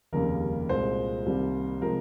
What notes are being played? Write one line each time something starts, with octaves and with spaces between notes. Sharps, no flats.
F1 D#2 C#3 G3 A#3 A#4
C2 A#2 G#3 C5
C2 C3 D#3 G3 A#3
C3 F3 G#3 A#4